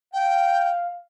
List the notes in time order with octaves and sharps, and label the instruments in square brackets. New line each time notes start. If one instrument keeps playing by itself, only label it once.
[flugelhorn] F5 [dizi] G5